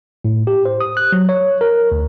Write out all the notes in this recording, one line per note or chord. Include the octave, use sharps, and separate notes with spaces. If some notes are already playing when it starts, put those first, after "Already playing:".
A2
G4
C5
D#6
F#6
F#3
C#5
A#4
D2